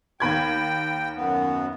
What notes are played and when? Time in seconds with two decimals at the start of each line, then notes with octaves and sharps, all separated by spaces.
0.20 D#2 G5 B5 G#6
1.15 F#2 B3